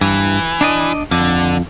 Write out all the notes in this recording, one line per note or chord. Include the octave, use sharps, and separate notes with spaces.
G2 E3
D4 D5 D#5
F2 D3